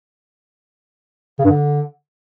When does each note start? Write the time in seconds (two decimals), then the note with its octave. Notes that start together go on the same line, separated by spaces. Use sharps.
1.39 C#3
1.44 G2
1.50 D3